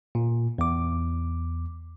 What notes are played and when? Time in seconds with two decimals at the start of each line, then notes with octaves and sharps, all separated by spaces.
0.15 A#2
0.58 E2 D6